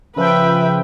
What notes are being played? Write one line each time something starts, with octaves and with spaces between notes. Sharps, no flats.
C#3 F3 B4 E5 G5